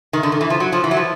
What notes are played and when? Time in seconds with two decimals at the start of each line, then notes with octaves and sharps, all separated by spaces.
0.13 D#3
0.23 D3
0.32 D#3
0.41 E3
0.50 F3
0.60 F#3
0.72 F3
0.84 E3
0.91 F#3
0.97 F3